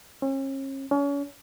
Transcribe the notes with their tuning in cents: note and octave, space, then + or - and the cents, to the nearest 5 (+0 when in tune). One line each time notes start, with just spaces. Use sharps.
C#4 -40
C#4 +35